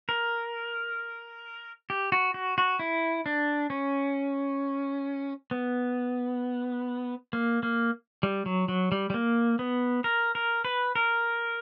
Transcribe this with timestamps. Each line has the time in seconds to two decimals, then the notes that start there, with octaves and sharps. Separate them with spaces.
0.09 A#4
1.90 G4
2.12 F#4
2.34 F#4
2.58 F#4
2.79 E4
3.26 D4
3.70 C#4
5.51 B3
7.33 A#3
7.63 A#3
8.23 G3
8.46 F#3
8.68 F#3
8.92 G3
9.10 G3
9.14 A#3
9.59 B3
10.04 A#4
10.35 A#4
10.65 B4
10.95 A#4